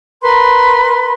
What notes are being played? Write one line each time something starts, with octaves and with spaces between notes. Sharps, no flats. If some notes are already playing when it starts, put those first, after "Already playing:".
A#4 B4 B5 C6